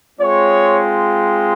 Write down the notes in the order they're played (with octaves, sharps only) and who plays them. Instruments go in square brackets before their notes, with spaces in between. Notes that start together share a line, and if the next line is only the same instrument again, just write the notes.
[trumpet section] G#3 C4 F4 C#5